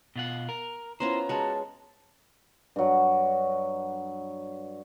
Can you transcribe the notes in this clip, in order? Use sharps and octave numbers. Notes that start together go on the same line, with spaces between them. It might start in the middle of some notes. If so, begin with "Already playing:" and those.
B2 F4 F#5
A#4
B3 C#4 E4 F4 C5 A#5
G#3 C#4 F#4 A5
G2 F#3